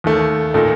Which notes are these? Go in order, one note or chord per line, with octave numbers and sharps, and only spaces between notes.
D#2 D#3 A3
A#2 A3 D#4 A4